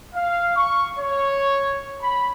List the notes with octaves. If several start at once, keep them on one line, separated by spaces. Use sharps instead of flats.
F5
C#6
C#5
B5